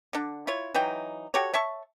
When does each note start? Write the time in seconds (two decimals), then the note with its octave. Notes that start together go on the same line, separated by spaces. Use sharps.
0.13 D3 D4
0.47 E4 F4 C#5
0.74 E3 F#3 D#4 G5
1.34 F#4 G4 A4 C#5
1.53 C#5 E5 A5 C#6